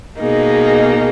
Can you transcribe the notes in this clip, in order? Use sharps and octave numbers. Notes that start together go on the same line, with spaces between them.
B2 A#3 D#4 G#4